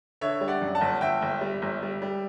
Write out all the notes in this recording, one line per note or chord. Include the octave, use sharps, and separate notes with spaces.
D3 C#5 E5
G3
D5 F#5
F#2
F#5 A5
G1
G1 E5 G5
G1
G3
G1
G3
G3